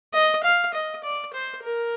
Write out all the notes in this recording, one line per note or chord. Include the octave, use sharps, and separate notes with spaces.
D#5
F5
D#5
D5
C5
A#4